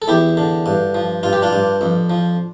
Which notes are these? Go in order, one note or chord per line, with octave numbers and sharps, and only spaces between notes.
A4
E2 E4 G4
D3
G2
F3
G2 F4
G4
D4 F4
G2
F2
F3